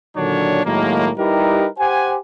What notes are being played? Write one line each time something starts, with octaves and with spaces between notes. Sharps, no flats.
A#2 D3 D#3 F#3 D4 C#5
A2 D#3 F#3 G#3 A#3
G3 D#4 E4 G4 A#4 B4
G4 C5 F#5 G#5